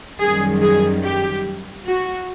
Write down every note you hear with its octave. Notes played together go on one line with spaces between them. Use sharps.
F#2 D#3 G3 G#4
G#4
G4
F#4